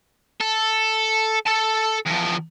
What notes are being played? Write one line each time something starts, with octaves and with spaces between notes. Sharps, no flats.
A4
A4 A5
E2 F3